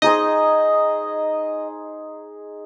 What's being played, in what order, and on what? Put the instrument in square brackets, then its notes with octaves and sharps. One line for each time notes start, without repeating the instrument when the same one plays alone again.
[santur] D#4 G#4 C5 [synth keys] D#5